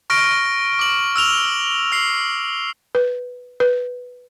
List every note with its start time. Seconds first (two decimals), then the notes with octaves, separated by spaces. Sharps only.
0.10 C#6 F6 A#6 D7
0.79 D6 F#7
1.16 E6 F6 F7 G7
1.92 E6 C7
2.95 B4
3.60 B4